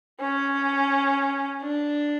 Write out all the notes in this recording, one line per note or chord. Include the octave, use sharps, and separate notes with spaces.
C#4
D4